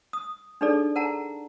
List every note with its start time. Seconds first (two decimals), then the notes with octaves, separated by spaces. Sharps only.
0.13 D#6
0.61 D4 D#4 G#4 A4 D5
0.96 A#4 F#5 A5 A#5